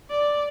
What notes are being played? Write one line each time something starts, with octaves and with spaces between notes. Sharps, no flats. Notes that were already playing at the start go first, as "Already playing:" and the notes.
D5